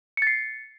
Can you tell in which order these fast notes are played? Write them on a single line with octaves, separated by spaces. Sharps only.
C#7 A6 C7